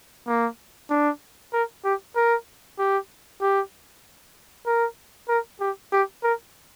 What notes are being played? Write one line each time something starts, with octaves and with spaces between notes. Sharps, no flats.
A#3
D4
A#4
G4
A#4
G4
G4
A#4
A#4
G4
G4
A#4